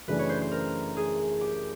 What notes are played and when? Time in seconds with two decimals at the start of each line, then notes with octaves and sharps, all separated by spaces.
0.08 F#2 C#3 E3 A3 D4 B4
0.19 C#5
0.29 C5
0.42 C5
0.52 A#4
0.97 G#4
1.41 G4